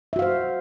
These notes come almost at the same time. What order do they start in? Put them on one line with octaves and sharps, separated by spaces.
E5 F#4 F5 C5